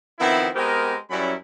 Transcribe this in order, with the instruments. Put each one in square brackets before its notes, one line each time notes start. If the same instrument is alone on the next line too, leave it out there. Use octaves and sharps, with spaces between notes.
[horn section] D#3 F3 B3 C4 E4
G#3 B3 C4 G4 A#4
F#2 F#3 G3 C#4 E4 B5